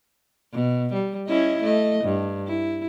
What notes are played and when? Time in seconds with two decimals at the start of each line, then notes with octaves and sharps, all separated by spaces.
0.53 B2
0.93 G3
1.27 C#4 E4 D#5
1.63 A3 D#5
2.04 G2
2.47 E4